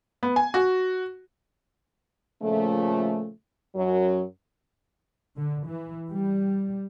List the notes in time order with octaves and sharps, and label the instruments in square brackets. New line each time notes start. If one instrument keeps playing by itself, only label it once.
[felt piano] B3
G#5
F#4
[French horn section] A#2 C#3 F3 A3
F#2 F#3
[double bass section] D3
E3
G3